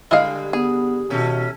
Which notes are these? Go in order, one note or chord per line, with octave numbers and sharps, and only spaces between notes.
D3 G3 G#3 E4 G#4 D#5 F5
B3 G#4
D#2 B2 A3 C#4